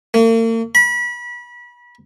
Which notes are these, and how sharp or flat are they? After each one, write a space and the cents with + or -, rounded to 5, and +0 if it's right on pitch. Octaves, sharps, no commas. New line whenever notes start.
A#3 -45
B5 -30